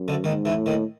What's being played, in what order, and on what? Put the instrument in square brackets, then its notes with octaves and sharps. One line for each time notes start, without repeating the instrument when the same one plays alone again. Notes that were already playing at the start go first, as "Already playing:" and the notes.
Already playing: [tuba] F#2
[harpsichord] D2 D3
[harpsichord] D#2 D#3 [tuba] G#2
[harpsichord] E2 E3
[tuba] A2
[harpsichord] D#2 D#3